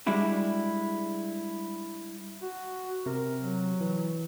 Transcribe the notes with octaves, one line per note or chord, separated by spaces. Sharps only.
G3 G#3 D4 E4 F#4
F#4
C3 A#4
F#3
E3